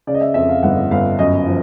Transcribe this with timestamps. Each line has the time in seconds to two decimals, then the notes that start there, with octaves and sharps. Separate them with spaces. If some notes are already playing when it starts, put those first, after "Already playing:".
0.07 C#3 D5
0.14 D#5
0.21 E5
0.34 F2 E5
0.49 F5
0.63 G1 F#5
0.91 G1 F5
1.18 F#2 D#5
1.47 F3